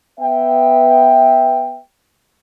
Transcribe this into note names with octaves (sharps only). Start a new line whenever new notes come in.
B3 E5 G5